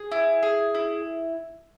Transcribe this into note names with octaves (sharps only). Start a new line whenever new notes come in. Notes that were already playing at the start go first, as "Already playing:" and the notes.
Already playing: G#4
E4
G#4
E4